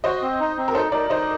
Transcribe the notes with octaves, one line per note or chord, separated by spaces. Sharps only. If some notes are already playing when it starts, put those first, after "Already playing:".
F#4 C5 D#5
C4
D#4
C4
A#4
D#4 A4 C5
D#4 A#4 D5
D#4 C5 D#5